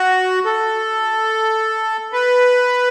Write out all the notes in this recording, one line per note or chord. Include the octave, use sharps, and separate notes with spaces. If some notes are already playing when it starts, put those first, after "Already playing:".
Already playing: F#4
A4
B4